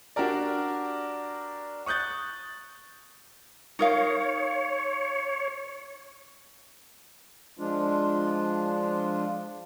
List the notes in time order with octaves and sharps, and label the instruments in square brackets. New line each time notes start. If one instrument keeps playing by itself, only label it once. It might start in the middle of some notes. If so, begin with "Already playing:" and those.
[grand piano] D4 F#4 G4 A#4 D5
C#6 D#6 F#6 G6 A6
[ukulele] D#4 A#4 F5 [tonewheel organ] C#5
[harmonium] F3 G#3 D4 F4